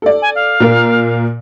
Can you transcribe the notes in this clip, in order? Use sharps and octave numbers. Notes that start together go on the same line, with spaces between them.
A4 D5
G#5
F5
A#2 A#4